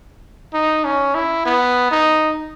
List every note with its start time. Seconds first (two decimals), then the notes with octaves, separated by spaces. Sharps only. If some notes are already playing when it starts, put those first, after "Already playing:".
0.54 D#4
0.85 C#4
1.15 E4
1.46 B3
1.91 D#4